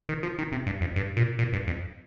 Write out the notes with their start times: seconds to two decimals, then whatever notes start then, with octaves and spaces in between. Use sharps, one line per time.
0.09 D#3
0.23 F3
0.38 D#3
0.52 C3
0.66 G2
0.81 F2
0.96 G2
1.17 A#2
1.39 A#2
1.53 G2
1.67 F2